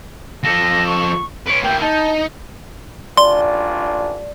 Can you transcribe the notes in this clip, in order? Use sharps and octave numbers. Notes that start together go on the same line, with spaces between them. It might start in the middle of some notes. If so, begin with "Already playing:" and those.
F3 A4 A#6
C#6
B4 C#5 D7
A#3 E4 G5
D#4 A5
A1 D4 F4 D5 C6